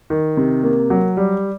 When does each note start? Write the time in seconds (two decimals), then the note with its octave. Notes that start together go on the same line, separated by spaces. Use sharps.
0.10 D#3
0.37 C3
0.63 A#3
0.90 F#3
1.17 G3